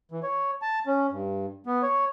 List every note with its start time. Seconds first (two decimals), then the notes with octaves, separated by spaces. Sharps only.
0.11 E3
0.23 C#5
0.62 A5
0.87 C#4
1.11 G2
1.66 B3
1.83 C#5